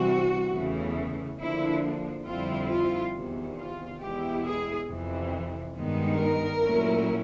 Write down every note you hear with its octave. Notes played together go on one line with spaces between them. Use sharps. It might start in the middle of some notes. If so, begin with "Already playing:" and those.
Already playing: C3 E3 G3 C4 F#4
E2 C#3 E3 A3
D3 F3 A#3 D4 E4
F2 D3 G3 C4 E4 F4
F4
E2 C3 D#3
F4
E2 B2 G#3 B3 E4 G4
G#4
F2 C3 E3
G2 D#3 G#3 B3 D#4
A#4
A#2 F#3 A3 C#4 E4